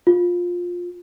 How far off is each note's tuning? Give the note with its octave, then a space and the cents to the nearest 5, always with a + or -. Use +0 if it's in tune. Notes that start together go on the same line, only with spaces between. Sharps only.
F4 +15